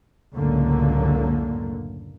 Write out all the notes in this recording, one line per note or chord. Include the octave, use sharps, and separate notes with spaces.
C#2 F#2 A2 D3 A#3